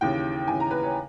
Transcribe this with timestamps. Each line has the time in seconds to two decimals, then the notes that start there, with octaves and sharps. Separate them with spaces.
0.01 D#2 C#3 E3 G5
0.48 D#2 C#3 E3 G#5
0.60 A#5
0.71 B4
0.83 C#5